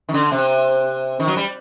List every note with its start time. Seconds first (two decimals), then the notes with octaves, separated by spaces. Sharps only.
0.09 D#3
0.14 D3
0.31 C3
1.20 D#3
1.27 F#3
1.36 G3